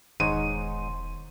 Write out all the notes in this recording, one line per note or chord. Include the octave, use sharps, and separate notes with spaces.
E1 G#2 D#3 D#4 C#5 C6 D#7